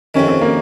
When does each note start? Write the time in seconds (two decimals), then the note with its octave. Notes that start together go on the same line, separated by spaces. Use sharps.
0.14 F2 C3 D#3 C#4
0.28 C4
0.41 A#3